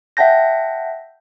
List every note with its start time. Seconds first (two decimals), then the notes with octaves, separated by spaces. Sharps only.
0.17 E5 F#5 G5 A5 G6 A#6